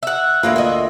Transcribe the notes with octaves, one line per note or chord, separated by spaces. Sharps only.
E5 F#5
D2 A#3 F4 B4
D#5 E5